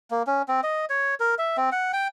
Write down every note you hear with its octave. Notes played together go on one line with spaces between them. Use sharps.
A#3
C#4
C4
D#5
C#5
A#4
E5
C4
F#5
G5